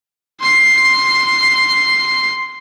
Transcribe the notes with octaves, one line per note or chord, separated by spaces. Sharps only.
C6 C7